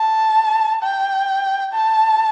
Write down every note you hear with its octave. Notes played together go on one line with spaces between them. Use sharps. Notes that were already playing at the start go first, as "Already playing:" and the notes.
Already playing: A5
G5
A5